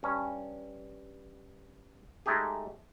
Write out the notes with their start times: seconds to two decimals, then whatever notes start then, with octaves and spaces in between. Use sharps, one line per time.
0.03 G2 C#4
2.26 G#3 A3 D#4 G4 G#4